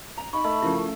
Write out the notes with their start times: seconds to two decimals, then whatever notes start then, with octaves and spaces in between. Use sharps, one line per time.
0.18 A#5
0.33 D#4 B5 C#6
0.44 A3 D#5
0.62 C#3 F3 E4 A#4 C#6